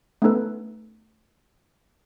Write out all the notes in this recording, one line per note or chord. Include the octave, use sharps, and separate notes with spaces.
A3 B3 C#4 D#4 A4 B4